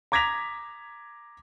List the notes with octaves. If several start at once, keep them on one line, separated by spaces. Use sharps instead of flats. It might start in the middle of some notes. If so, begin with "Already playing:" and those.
A#5 D6 G#6 A#6 B6 F7